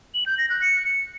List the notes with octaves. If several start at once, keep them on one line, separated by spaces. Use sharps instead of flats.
F#7
G6
A#6
F#6
C#7